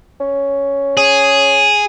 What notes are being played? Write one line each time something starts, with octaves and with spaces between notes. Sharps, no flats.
C#4
C#4 G#4